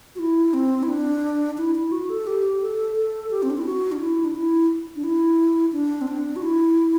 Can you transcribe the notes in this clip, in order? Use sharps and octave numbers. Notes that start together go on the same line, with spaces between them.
F#4
E4
C4
E4
D4
E4
E4
F#4
A4
G4
A4
A4
G4
C4
D4
E4
F#4
D4
E4
D4
E4
D4
E4
D4
C4
D4
F#4
E4